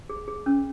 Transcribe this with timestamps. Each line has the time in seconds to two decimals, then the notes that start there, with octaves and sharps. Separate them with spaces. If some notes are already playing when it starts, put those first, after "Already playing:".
0.09 G#4
0.28 G#4
0.46 C#4